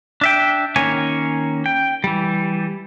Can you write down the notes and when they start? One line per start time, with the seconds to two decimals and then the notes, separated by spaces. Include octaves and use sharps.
0.21 D4 E5 G5
0.76 D#3 A#3 C#4 C#5 G#5
1.66 G5
2.04 E3 G3